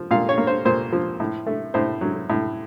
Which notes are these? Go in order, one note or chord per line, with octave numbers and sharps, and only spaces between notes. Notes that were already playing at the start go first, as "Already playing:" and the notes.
Already playing: F3
A#2 F5
C#5
A#3
C5
A#2 C5
F3
A2
A3
A2 C5
F#3
A2